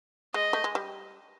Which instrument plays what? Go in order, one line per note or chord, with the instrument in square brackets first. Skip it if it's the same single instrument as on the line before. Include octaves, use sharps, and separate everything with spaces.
[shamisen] G#3 [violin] D#5
[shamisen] A3
G#3
G3